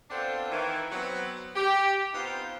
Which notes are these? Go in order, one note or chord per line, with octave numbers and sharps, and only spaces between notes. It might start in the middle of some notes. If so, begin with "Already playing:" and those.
B3 C4 D4 F4 A4 C5
D#3 E3
F#3 B3 C4
G4
B3 C4 D#4 F4 G4 C5